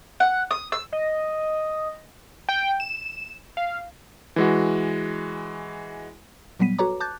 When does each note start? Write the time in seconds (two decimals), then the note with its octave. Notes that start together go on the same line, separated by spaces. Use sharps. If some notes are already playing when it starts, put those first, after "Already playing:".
0.20 F#5
0.51 D#6
0.72 E6
0.92 D#5
2.49 G5
2.80 E7
3.57 F5
4.36 E3 G#3 F#4
6.59 A#2 F#3 G3 B3 B6 D#7
6.78 F#4 A4 B4 C#5 A#5 D6
7.00 A5 D6 F#6 G6 A6